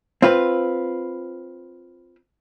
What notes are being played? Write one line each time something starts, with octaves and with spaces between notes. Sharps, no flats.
C4 F4 B4